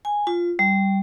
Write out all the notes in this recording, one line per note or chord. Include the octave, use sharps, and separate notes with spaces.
G#5
F4
G3